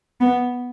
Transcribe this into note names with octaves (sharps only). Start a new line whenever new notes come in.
B3